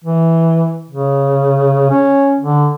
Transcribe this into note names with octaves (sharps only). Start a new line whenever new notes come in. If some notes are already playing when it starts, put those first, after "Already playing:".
E3
C#3
C#4
D3